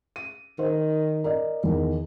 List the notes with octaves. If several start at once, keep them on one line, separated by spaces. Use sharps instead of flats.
D#7
D#3 C5
A#4 D5 D#5
E2 D#3